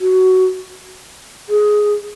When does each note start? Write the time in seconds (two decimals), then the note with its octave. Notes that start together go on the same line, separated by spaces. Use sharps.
0.01 F#4
1.49 G#4